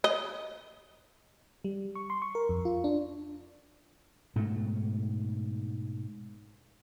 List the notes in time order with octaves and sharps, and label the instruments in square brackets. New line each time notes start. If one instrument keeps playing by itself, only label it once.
[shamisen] D#5
[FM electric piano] G3
C#6
C6
C#6
A#4
F2
F4
D4
[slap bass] G#2 B2 A3